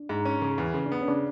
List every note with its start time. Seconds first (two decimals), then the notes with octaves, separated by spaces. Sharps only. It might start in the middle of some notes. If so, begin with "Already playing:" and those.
Already playing: D4
0.09 G#2
0.25 C#4
0.42 C#3
0.58 E2
0.74 C#3
0.86 D4
0.92 B3
1.01 C#4
1.08 C#3 D4